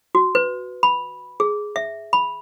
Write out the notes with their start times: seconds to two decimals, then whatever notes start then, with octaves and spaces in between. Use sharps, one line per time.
0.15 F#4
0.35 B4
0.83 B5
1.40 G#4
1.76 E5
2.13 B5